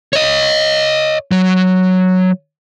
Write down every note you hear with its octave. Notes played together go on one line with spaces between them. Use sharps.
C#5 D#5
F#3